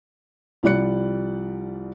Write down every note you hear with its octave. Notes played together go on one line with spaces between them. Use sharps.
C2 F3 G3 D5 F#6 C#7